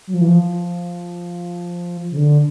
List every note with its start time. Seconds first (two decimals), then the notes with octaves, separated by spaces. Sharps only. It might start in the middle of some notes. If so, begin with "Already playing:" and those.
0.07 F#3
0.14 F3
0.21 E3
0.28 F3
2.11 C#3
2.17 D3